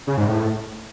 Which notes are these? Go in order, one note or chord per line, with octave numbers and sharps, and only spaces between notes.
C#3
G#2
A2